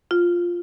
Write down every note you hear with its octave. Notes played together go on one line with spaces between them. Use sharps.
F4